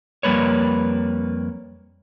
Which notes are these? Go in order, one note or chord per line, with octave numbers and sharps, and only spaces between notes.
F2 G3 A#3 B4 C#5